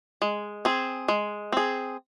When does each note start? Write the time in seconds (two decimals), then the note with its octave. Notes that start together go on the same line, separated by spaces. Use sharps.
0.22 G#3
0.65 C4 G#4
1.08 G#3
1.52 C4 G#4